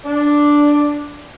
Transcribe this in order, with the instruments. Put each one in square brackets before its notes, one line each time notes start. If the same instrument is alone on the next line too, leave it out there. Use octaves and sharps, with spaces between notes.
[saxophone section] D4